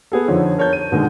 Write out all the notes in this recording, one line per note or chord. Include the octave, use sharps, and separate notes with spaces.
B3 G#4 A4
F2 D3 F3 D#4 C#5
A#4 C#5 A5 G6
D#7
B2 D3 D#3 G#3